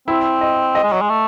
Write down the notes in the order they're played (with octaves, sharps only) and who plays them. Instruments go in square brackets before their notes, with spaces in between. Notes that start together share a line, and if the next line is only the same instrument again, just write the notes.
[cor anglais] C4 [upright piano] E4
[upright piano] D#5
D#5
[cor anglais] G#3
F#3
G#3
A3